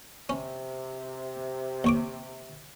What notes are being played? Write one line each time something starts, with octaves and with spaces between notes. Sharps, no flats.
C3 C#4
D#2 C#5 D6